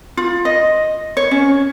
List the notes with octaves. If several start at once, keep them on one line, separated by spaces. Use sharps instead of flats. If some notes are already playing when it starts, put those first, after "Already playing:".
F4
D#5
C#5
C#4